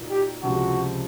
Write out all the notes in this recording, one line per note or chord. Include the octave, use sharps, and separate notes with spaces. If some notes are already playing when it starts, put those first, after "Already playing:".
Already playing: A#2 F#3 A#3 D#4
G4
C#2 C3 F3 G#3 F#4